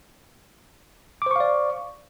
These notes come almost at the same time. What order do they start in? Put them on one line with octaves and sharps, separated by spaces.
D6 C5 C#6 F5 D5